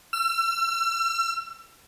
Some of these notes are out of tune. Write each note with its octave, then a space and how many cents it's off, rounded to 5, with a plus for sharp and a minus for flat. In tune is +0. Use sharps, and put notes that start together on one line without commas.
E6 +40